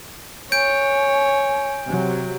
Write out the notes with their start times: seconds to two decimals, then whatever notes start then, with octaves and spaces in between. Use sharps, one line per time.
0.52 C#5 G#5 G6 D7
1.86 C3 F#3